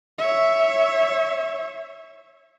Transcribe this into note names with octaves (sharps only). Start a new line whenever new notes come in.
C#5 E5